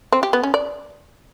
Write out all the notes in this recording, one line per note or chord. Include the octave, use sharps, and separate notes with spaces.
C4
G4
B3
C#4
D5